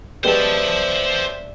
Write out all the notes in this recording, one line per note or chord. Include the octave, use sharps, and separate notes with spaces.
G#3 B3 G4 C5 D5 E5 A5